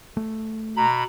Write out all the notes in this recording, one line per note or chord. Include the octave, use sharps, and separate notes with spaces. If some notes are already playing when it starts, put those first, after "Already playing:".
A3
B2 A#5 B5